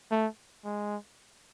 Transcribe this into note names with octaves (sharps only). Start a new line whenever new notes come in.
A3
G#3